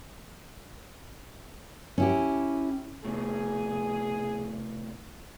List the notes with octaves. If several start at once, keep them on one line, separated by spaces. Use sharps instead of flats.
C#4 E4 G4
A2 C3 G#4